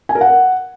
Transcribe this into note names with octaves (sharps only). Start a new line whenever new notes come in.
G#5
A#4
F#5